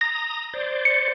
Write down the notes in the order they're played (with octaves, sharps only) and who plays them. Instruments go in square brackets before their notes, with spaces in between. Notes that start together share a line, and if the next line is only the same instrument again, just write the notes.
[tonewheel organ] A#5 D#6 [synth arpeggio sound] A#6
[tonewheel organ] C5 D5
[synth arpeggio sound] C#7